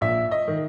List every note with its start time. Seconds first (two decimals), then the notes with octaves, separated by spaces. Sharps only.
0.01 A#1 E5
0.31 D#5
0.48 D#3